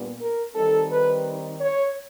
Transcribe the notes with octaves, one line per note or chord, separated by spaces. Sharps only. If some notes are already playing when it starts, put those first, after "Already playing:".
Already playing: A#2 G3 B3 D4
A#4
D#3 G3 C4 D#4 A4
B4
C#5